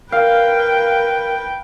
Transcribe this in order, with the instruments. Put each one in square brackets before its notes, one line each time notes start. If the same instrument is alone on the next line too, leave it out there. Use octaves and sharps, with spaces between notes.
[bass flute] A#4 [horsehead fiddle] B4 G5 [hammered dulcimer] F5